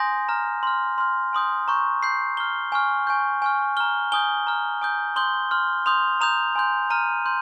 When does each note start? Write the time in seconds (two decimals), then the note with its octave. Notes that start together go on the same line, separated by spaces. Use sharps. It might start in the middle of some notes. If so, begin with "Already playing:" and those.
Already playing: G#5 C6 D#6 G6 A#6
0.29 A#5 F6
0.63 C6 F6
0.98 C6 F6
1.33 G#5 C6 D#6 G6
1.68 A#5 C#6 G6
2.03 C6 G6 C7
2.37 A#5 F6 G7
2.72 G#5 C#6 F6
3.07 G#5 C#6 G6
3.42 G#5 C#6 F6
3.77 A#5 F6 G7
4.12 G#5 D#6 G6 G7
4.47 A#5 F6
4.82 G#5 D#6 G6
5.16 C6 D#6 G6 G7
5.51 C6 F6
5.86 C6 D#6 G6 F7
6.21 A#5 D#6 G6 F7
6.56 G#5 C6 G6
6.90 A#5 F6 D#7
7.26 C6 G6